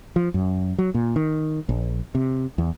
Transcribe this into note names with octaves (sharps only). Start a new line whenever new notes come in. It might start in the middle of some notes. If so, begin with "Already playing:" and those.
F3
F#2
F#3
A#2
D#3
A#1
C3
E2